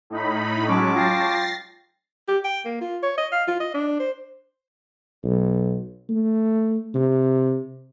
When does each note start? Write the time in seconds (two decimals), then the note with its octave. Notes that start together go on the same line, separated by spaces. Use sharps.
0.10 A2 D#4 B5
0.67 F#3 G#3 C#4 A5 C#6 D6
0.95 F4 G5 A6 A#6 C7
2.28 G4
2.45 G5
2.65 A#3
2.81 F4
3.03 C#5
3.18 D#5
3.32 F5
3.47 F4
3.60 D#5
3.74 D4
4.00 C5
5.24 B1
6.09 A3
6.95 C3